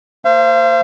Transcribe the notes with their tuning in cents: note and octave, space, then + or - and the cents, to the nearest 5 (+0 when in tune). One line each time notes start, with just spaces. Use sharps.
A#3 -15 C5 +0 F5 -40